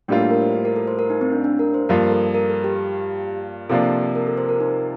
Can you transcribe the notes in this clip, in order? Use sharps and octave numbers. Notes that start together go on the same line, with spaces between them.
A2 G3 A#3 D4 F4
A4
A#4
C5
C5
A#4
A4
C5
A#4
D#4
C4
D4
D4
A#4
C5
G2 F3 A#3 F4 A#4
A4
A#4
A4
G4
C3 F3 A#3 D4 F4 A4
A#4
A4
C5
A#4
D#4